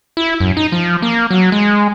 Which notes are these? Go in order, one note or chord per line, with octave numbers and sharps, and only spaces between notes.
E4
F#2
D#4
F3
A#3
F#3
G#3